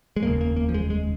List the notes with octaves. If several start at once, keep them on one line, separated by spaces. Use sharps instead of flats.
G#3
F1 D#2 C#3 A#3
A#3
A#3
F3
G#3
G#3